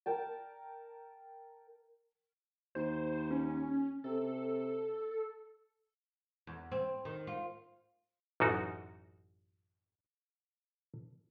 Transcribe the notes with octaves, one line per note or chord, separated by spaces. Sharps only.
A#4 G5 A5
D#2 C5
C#4
C3 A4
E2
C4
D#3
F4
A1 F#2 D#4 F#4